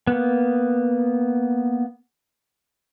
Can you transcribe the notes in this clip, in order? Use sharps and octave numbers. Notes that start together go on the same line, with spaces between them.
A#3 B3